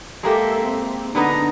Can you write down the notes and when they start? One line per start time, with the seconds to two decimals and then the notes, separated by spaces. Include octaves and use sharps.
0.23 G#3 A#3 G4 A4 E5
0.65 C4
1.15 D3 B3 D4 D#4 A#5